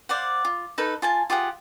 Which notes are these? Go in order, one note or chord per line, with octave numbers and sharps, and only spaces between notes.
C5 D5 F5 F#5
F4
D#4 A4 B4
F4 G#5 A5
F4 G4 G#4 F#5